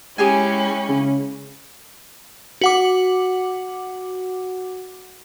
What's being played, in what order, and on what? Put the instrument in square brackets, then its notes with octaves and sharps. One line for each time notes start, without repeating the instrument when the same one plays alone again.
[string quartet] G#3 E4 [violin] C#4 [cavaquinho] G4 G#4 G#5
[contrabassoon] C#3
[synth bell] F#4 F#5 D6